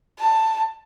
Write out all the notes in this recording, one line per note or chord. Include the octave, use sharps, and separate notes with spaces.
A5